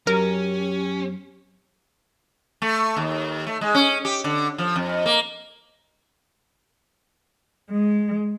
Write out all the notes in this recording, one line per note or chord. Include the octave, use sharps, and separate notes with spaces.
F#2 C#4 G4 A#4
A3
D#2
A3
G#3
C#4
G4
D3
F3
F2
A#3
G#3